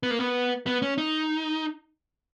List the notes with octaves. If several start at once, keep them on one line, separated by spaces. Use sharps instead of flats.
B3
A#3
B3
B3
C#4
D#4